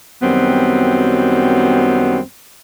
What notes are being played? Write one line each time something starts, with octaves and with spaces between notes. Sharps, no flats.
F#2 D#3 F#3 G3 B3 C4